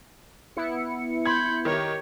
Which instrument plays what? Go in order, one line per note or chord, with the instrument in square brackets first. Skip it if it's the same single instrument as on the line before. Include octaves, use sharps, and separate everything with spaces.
[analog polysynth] B3 E4 C#7
[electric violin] B5 G6 [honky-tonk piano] C6 G#6
[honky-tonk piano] D#3 [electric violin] G4 C#5